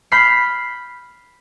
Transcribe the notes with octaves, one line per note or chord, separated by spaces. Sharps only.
B5 F6 G6 B6 C7